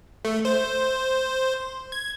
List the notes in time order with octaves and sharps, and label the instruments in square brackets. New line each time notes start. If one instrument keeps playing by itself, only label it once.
[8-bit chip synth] A3
C5
G#6